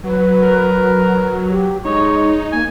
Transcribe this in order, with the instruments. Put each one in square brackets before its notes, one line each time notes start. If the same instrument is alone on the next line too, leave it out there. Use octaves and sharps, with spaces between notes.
[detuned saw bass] F#3 [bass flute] B4
[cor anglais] A#4
[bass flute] G4
[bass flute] G#3 [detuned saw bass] D#4 [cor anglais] C#5
[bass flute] A#3 [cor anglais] G#5